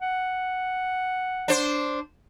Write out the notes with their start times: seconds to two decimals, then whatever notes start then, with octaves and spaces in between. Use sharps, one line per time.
0.01 F#5
1.48 D4 C5